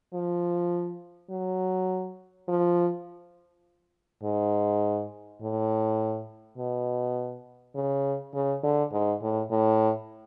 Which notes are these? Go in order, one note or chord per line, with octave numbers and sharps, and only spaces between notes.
F3
F#3
F3
G#2
A2
B2
C#3
C#3
D3
G#2
A2
A2